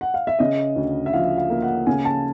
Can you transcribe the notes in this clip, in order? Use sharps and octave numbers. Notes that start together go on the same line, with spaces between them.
F#5
F5
E5
C#3 D#5
D2
E5
F3 F5
F5
A#3
F#5
C#3 G#5
A5